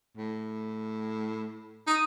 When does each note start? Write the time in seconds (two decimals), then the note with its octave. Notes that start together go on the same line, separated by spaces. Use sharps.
0.17 A2
1.87 D#4 D#6